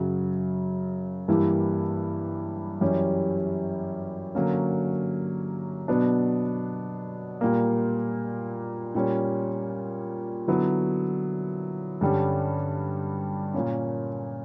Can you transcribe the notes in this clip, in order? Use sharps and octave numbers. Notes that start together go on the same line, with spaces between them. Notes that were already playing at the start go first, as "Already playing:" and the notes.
Already playing: F#2 C#3 F#3
G2 E3 A#3 E4 G4
F#2 E3 G3 C#4 G4
D3 F#3 A#3 C#4
B2 F#3 B3 D4
A#2 G3 A#3
A#2 G3 C#4
D3 F#3 B3 E4
G2 D3 G3 C#4 G4
A#2 A#3 C#4